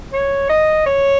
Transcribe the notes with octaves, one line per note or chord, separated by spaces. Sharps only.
C#5
D#5
C#5